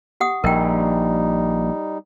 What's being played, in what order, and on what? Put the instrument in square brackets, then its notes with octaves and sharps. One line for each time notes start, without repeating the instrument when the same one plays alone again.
[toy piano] G4 F#5 D#6
[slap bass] A#1 [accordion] G3 D#4 [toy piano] A#4 G5